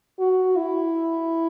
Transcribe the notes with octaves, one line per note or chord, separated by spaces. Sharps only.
F#4
E4